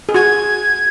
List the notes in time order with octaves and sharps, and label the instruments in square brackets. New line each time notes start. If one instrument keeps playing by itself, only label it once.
[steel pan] G#4
[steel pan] F#4 [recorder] G#6